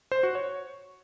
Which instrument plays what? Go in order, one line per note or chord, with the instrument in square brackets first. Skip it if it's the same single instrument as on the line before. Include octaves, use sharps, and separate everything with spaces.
[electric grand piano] C5
F#4
C#5